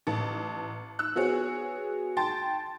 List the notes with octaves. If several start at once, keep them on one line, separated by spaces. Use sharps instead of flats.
A1 A5
E6 F#6
B3 F#4 G#4 C#5
G5 A5 C6 A6